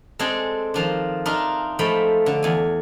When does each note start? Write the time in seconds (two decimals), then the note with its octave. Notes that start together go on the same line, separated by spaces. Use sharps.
0.19 G#3 C4 D4 G#4 A4 G5
0.74 D#3 F3 D4
1.26 D4 D#4 F4 A#4 E5
1.79 F3 G#3 A3 G5 B5
2.26 D3
2.43 E2 G#5